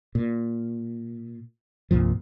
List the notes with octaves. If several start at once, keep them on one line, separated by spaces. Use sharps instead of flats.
A#2
C2 G2 A#2 F3